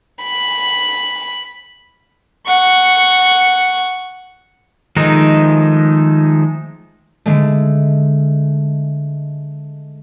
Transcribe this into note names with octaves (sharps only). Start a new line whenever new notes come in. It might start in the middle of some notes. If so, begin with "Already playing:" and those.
B5
F#5 C#6
D#3 F3 G#3 A3 D#4
D3 G#3 A3